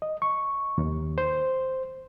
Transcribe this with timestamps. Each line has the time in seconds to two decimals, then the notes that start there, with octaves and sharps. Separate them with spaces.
0.02 D#5
0.22 C#6
0.78 D#2
1.18 C5